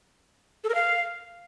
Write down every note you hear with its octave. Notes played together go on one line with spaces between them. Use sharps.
A4
A#4
F5